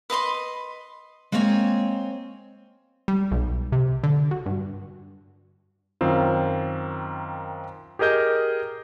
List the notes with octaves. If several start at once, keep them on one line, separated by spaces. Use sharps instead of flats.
B4 D#5 B5 C6
G#3 A#3 C4 C#5 G#5
G3
B1
C3
D3
F#3
G2
F#2 D#3 C4 F4
G4 G#4 A#4 D#5 G6